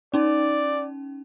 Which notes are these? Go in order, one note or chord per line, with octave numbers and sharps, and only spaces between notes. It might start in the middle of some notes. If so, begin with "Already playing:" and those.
C#4 D#4 D5